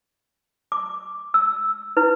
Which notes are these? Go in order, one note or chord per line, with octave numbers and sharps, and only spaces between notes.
D6
E6
E4 B4